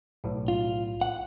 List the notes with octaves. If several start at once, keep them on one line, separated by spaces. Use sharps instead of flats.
B1 A2
F4
F#5